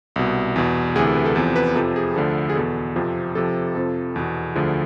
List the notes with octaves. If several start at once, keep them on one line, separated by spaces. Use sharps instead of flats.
C2 B2
E2 B2
D2 C3 E3 G#4
A4
B4
A4
E2 C3 F3 A4
B4
F2 C3 F3 A4
G#4
D2 D3 F3 A4
G#4
E2 B2 A4
F2 C3 F3
F2 C3 F3 A4
F2 C3 F3 A4
E2 B2
D2 D3 F3 G#4